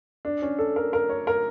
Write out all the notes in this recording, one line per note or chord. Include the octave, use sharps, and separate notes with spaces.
D4
C#4
A4
A#4
A#4
C#5
A#4